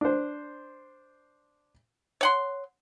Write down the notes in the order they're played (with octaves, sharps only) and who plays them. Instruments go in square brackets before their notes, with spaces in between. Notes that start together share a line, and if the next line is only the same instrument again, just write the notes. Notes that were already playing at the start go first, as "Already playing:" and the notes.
[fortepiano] D4 C5
[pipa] C#5 F#5 C6